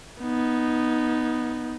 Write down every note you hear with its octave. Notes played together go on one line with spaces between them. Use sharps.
B3 D#4